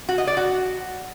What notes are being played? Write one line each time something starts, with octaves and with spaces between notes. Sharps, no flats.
F#4
D#5
D5
F#4